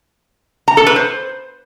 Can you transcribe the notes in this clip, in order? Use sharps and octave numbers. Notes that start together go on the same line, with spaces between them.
A#5
A4
B4
C5